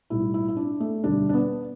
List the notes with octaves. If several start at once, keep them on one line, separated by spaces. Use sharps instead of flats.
B1 A2 G3 E4
E4
E4
D4
A3
E1 D2 D3 G3 D4
D4
B3